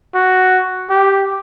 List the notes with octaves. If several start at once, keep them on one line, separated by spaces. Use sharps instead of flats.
F#4
G4